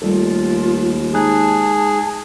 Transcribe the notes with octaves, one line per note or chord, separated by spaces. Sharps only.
D#2 G3 A3 F4 A4
G#3 D#4 G#4 A5 F#6